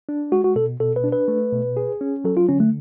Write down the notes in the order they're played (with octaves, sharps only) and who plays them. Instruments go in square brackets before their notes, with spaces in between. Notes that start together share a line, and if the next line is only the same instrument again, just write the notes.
[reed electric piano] D4
[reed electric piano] G#3 [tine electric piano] F#4
[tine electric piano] F#4
[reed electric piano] B2 [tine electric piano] A4
[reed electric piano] B2 [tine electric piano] A4
[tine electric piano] B4
[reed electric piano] D4
[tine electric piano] B4
[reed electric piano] A3
B2
G#4
C#4
[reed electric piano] F#3 [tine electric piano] A4
[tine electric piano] F4
[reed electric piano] D3 [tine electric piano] C#4
[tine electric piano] A3